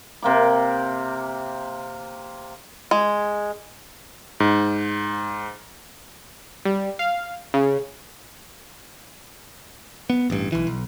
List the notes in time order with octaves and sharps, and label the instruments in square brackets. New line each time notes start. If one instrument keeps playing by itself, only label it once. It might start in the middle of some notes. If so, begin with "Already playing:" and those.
[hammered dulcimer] C3 A#3 D6
[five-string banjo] G#3
[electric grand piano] G#2
[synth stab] G3
F5
C#3
[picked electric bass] B3
A1 G2
B1 E3
B1